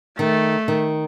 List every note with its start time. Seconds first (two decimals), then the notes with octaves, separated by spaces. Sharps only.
0.19 D#3 A3
0.68 D#3